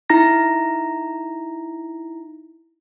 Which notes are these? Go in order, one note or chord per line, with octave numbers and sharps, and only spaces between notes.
D#4 E4 A#5 A#6